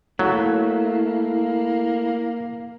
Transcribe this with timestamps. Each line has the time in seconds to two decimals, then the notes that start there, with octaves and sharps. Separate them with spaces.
0.19 F#3 A3 A#3 E4